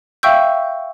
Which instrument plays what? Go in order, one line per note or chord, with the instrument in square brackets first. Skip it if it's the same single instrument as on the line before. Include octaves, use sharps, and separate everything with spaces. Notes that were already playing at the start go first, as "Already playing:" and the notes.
[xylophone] E5 F5 G5 C#6 E6 G6